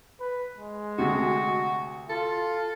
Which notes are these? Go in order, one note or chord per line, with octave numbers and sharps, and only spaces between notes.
B4
G#3
D2 C3 F#4
F4 A4